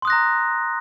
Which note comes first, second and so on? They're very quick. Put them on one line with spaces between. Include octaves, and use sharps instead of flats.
C6 D#6 F#6 A#6 A#5